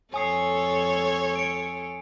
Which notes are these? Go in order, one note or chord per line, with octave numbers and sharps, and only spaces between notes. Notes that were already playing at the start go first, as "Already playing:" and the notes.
F2 A4 C#5 G#5 D#6 C7
C#7 D7